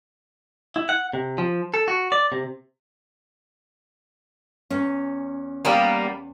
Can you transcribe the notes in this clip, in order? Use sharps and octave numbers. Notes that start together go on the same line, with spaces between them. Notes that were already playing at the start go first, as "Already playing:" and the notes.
E4
F#5
C3
F3
A4
F#4
D5
C3
E2 C#4
G3 A#3 B3